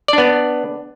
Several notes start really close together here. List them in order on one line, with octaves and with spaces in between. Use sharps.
D5 D4 B3